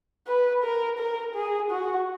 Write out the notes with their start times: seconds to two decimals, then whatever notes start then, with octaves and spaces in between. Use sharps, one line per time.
0.27 B4
0.63 A#4
0.99 A#4
1.35 G#4
1.71 F#4